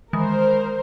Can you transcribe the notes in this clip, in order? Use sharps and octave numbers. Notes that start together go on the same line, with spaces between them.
D#3 E3 G#3 A#4 C5